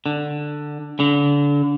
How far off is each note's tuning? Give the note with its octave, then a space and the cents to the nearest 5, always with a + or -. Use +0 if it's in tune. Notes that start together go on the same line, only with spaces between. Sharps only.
D3 +10
D3 -30